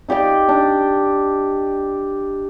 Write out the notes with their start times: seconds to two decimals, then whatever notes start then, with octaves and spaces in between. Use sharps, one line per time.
0.08 D#4 G4 D5 G5
0.49 D4